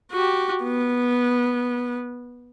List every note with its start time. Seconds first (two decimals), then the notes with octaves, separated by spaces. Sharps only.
0.12 F#4 G4
0.63 B3